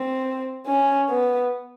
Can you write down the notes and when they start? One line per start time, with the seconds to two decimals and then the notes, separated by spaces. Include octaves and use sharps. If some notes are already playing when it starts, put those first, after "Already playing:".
Already playing: C4
0.67 C#4
1.10 B3